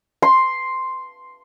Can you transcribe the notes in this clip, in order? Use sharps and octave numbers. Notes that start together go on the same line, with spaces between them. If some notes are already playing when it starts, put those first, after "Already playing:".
C6